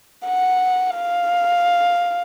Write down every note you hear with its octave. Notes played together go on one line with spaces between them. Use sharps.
F#5
F5